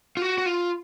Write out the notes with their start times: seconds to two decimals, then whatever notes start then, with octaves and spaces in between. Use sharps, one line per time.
0.17 F4
0.22 F#4
0.38 F#4
0.46 F4